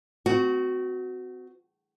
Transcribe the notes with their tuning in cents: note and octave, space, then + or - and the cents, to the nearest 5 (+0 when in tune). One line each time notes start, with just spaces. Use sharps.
C4 -35 F#4 +0